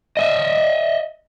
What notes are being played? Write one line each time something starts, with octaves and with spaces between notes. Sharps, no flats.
D#5 E5